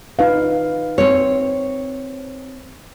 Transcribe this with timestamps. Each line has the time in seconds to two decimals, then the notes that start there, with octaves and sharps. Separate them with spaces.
0.19 D#4 B4 F5
0.98 C4 C#5